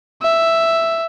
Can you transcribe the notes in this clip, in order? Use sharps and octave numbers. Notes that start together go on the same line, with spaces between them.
E5